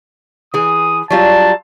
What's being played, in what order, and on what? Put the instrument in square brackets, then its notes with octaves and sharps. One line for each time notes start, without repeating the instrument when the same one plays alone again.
[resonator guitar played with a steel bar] E3 G#4 [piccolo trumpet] D#6
[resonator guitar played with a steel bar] F#3 G3 F4 [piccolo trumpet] A5